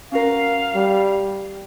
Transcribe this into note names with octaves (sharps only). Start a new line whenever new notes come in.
C#4 F#4 A#4 F5
G3